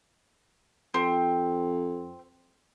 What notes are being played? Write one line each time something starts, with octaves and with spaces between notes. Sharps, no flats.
F2 C4